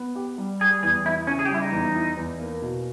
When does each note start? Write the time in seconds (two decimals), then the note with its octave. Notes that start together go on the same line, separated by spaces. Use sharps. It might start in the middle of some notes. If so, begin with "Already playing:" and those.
Already playing: B3
0.16 G4
0.38 G3
0.61 G3 G#4
0.83 E2 G#4
1.05 E3 E4
1.27 C#3 C#4
1.39 G#4
1.45 G4
1.50 G3 E4
1.61 D#4
1.72 E2
1.95 E4
2.17 E2
2.40 A#3
2.62 B2